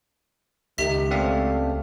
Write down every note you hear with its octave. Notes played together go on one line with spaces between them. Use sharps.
C#2 D#3 G4 E5 B6
A3 C4 D5 F5